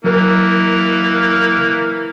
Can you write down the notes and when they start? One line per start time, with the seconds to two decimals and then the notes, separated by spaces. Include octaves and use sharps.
0.04 E3 F#3 A#3 A#4